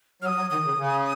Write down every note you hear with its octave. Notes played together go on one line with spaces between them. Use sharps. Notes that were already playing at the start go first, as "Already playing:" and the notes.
F#3 F6
D#6
F#3
D#3 D#6
C#3
C#3